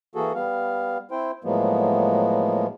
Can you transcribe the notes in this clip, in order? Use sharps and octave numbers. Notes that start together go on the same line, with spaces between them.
E3 A#3 F#4 G#4 A4
G3 B3 F5
C4 E4 C5 G5
A2 F3 F#3 G#3 A#3 B3